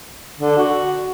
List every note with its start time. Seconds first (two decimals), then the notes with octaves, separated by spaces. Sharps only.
0.40 D3
0.58 F#4